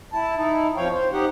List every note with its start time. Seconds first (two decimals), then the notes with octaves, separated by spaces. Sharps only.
0.13 E4 A5
0.37 D#4 E4
0.76 F2 F3 C#5 F5 G5
0.92 C5
1.13 D#4 G4 F#5